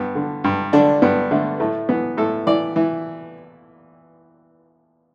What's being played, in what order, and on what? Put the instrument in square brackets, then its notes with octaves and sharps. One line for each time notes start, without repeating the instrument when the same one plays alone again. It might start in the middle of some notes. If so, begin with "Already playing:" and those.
Already playing: [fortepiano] G2 B3
D3
G2
D3 D4
G2 B3
D3 A3
A2 A3
E3 B3
A2 A4
E3 D5
E3